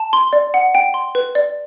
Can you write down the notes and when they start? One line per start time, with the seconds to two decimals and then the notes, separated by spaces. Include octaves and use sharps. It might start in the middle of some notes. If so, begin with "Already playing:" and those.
Already playing: A5
0.13 C6
0.33 D5
0.54 F#5
0.75 G5
0.94 C6
1.15 B4
1.35 D5